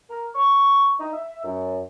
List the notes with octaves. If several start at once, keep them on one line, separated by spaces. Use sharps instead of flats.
A#4
C#6
D#4
E5
F#2